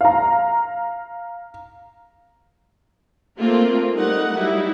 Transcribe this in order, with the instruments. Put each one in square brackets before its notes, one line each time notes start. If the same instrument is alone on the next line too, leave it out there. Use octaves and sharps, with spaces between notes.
[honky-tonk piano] F5 A#5
[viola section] A3 A#3 C4 F4 A4 A#4
G3 A3 D#4 A#4 F#5
F#3 G3 D#4 E4